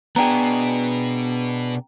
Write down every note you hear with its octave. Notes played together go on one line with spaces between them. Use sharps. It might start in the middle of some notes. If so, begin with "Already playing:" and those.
B2 B3 D4 G#4 G5 A#5